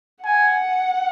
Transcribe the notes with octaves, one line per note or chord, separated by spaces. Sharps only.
F#5 G#5